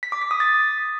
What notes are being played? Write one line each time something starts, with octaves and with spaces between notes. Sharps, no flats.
B6
D6
B6
D#6
A6